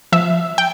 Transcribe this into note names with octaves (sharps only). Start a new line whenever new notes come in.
F3 E5
G5